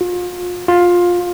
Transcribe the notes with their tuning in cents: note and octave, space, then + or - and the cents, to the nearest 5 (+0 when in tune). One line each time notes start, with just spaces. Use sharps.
F4 +35
F4 +15